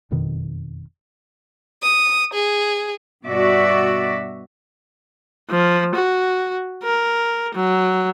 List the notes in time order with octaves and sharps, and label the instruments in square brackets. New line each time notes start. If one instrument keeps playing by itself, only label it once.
[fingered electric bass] F#1 F2 B2 D#3
[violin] D#6
G#4
[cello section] G2 B2 F#4 D5 E5
[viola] F3
F#4
A#4
F#3